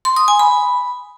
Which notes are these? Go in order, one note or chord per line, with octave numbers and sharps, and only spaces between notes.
C6
D#6
G#5
B5